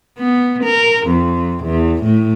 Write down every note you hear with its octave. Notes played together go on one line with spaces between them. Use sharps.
B3
A#4
F2
E2
A2